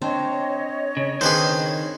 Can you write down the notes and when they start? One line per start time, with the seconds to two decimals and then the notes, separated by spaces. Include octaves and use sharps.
0.02 C4 D4 C5 C#5 D#5
0.97 C#3
1.21 D#3 C4 D4 G#4 B4 C5